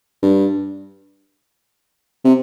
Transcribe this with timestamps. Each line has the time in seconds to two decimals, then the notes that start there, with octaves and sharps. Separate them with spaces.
0.23 G2
2.25 C3